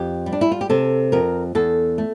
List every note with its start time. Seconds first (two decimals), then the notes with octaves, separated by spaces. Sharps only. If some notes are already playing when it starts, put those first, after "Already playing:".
Already playing: F2 G4
0.26 G3
0.32 D4
0.41 E4
0.51 F4
0.61 G4
0.70 C3 A4
1.12 F2 A#4
1.55 E2 A4
1.98 A3